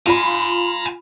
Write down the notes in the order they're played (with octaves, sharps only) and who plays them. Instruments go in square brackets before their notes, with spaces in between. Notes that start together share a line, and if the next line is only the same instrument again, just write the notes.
[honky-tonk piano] F4 B5 [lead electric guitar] G#5 A#5